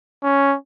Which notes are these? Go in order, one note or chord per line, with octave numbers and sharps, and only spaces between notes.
C#4